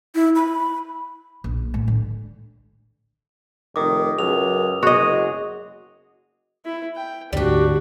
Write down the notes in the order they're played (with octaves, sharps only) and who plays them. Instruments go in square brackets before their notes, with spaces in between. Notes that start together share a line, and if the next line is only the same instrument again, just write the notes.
[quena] E4
B5
[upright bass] A#1
A2
D3
[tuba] F1 [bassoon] D#3 [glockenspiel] D6 D#6
[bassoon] C#2 [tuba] F#2 [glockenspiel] F7
[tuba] F#1 [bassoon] G#3 [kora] F#4 D#5
[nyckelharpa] E4
G5
[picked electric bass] D2 G#2 D3 [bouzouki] G3 G4 [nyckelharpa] D4 F#4